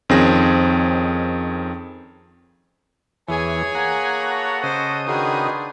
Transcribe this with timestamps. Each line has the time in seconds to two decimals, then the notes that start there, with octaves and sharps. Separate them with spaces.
0.09 F2 D#3 C4 C#4 G#4 A#6
3.29 E2 E3 G#4 C#5 G#5
3.75 A#3 F#5 A#5
4.19 F#4 A4 B4
4.63 C#3 C5 D#5 D#6
5.07 D#3 D4 D#4 F4 F#4 G#4 B4 G5